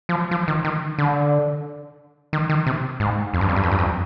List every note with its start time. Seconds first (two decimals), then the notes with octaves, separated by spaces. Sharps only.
0.09 F3
0.31 F3
0.48 D#3
0.65 D#3
0.98 D3
2.33 D#3
2.50 D#3
2.66 C3
3.00 G#2
3.34 F2
3.41 G2
3.49 F2
3.56 G2
3.63 F2
3.71 G2
3.79 F2